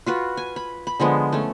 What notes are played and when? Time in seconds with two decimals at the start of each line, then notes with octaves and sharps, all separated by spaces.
0.06 F4 F#4 B4
0.37 G#5
0.56 B5
0.87 B5
1.00 D3 F3 G#3 B3
1.33 A3 C#4